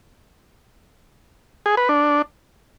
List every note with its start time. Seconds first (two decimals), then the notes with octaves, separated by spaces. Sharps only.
1.66 G#4
1.77 B4
1.89 D4